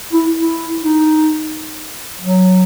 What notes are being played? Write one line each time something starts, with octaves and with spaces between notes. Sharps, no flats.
E4
E4
D#4
F#3